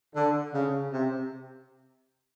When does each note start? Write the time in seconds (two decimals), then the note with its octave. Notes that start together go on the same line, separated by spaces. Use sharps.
0.15 D3
0.54 C#3
0.92 C3